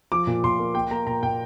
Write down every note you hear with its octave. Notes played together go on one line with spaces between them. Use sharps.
F3 D6
A#2
A#2 C6
A#3
A#3 G5
A#3 A#5
A#2 A#5
A#2 G5